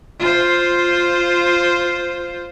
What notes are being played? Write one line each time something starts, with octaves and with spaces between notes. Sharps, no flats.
F4 C5